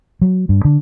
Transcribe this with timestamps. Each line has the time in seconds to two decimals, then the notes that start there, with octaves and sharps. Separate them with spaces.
0.21 F#3
0.49 G2
0.65 D3